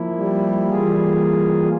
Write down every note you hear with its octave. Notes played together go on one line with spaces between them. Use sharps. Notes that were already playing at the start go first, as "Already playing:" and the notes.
Already playing: F3 A#3 E4
G3
E3 A#3 F4 G#4